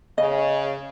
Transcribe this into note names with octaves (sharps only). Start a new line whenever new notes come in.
C#3 D#5